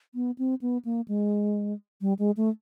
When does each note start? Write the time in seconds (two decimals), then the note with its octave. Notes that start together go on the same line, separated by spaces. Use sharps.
0.15 B3
0.38 C4
0.62 B3
0.85 A#3
1.08 G#3
2.01 G3
2.19 G#3
2.37 A3